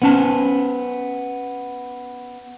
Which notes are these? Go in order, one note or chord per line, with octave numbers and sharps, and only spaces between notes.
B3 C#4 A5